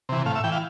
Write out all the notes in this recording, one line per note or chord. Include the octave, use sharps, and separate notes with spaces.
C3 E3
A2 F5
E5
E3 G5
F5